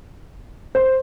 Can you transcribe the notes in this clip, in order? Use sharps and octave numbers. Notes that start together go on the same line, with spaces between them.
C5